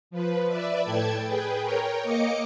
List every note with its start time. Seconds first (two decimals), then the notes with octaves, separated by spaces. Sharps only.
0.11 F3 B4
0.48 B4 D5 E5
0.82 A2 A3 G5 A5 G#6
1.26 G#4 B4 G5
1.62 A#4 C#5 G5
2.03 A#3 D#5 D6 C#7